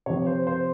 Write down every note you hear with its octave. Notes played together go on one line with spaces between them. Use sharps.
C3 F3 C#5
C5
C5